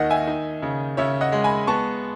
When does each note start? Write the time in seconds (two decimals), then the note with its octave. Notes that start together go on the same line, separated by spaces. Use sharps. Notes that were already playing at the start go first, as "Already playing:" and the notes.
Already playing: D#2 D#3 D#4 D#5 F#5
0.10 E5 G#5
0.27 D#4
0.62 C#3
0.97 C#3 C#5 E5
1.21 D#5 F#5
1.32 G#3
1.44 G#5 B5
1.67 B3 A5 C#6